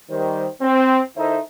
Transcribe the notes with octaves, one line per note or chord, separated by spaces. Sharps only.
D#3 G3 C5
C4
D#3 D#4 E4 A4 C5 E5